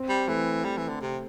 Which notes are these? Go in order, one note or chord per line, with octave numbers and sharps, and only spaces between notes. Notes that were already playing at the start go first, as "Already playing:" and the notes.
Already playing: C4
G3
E3 A3
G3
E3
D3
C3